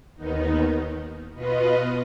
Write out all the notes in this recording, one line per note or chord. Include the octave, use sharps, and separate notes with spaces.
D#2 D#3 B3 D#4
B2 B3 F4 B4 D#5